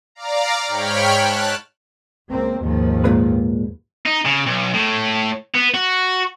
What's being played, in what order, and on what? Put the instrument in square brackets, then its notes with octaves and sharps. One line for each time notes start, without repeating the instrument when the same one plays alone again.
[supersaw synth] D5 F5 A#5
G#2 C#5 G5 B5 F6
A5 F#6
[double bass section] C#2 A#3 C4
D#2 G#2 F3
[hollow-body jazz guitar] A#2 G#3 B4
[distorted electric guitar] D#4
C#3
B1
A2
B3
F#4